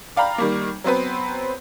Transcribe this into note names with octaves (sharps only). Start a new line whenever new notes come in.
D5 F5 G5 A#5 B5
D#3 G3 A#3
F#3 B3 C4 B4